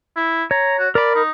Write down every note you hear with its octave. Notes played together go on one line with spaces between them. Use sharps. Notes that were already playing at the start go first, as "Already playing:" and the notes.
E4
C#5 A#5
F#4
A#4 D5 B5
D#4